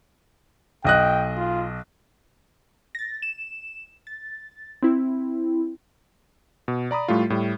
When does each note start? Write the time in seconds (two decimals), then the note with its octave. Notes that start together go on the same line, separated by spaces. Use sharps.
0.85 B1 D#5 G5 F#6
1.37 F4
2.95 A6 A#6
3.22 E7
4.07 A6
4.83 C4 E4
6.68 B2
6.91 D5 A#5 B5 D#6
7.08 A2 G3 A3 F4
7.30 A2 G3